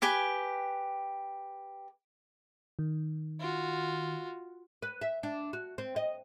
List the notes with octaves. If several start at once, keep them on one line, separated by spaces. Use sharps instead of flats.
G4 B4 G5 G#5
D#3
F4 F#4
B4
E5
D4
F#4
C4
D#5